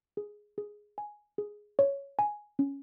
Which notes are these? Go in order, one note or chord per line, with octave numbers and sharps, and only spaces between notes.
G#4
G#4
G#5
G#4
C#5
G#5
C#4